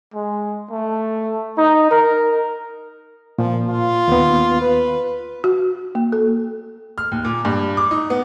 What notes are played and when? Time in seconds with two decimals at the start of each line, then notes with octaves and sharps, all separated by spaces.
0.13 G#3
0.71 A3
1.58 D#4
1.91 A#4
3.39 A#2 F3
3.70 F4
4.08 D#2 B3
4.62 B4
5.44 F#4
5.95 A#3
6.12 A4
6.98 F6
7.12 D#2
7.25 A#2
7.45 G2
7.77 D6
7.91 D#4
8.10 B3